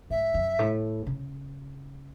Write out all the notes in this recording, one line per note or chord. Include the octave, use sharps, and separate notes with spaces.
G#2 E5
F#2
A2
C#3